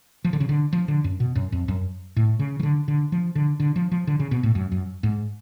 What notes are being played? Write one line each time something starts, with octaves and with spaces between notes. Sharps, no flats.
F3
D3
C#3
D3
F3
D3
F#2
B2
F#2
F2
F#2
A2
C#3
F3
D3
D3
F3
D3
D3
F3
F3
D3
C#3
B2
A2
F#2
F#2
G#2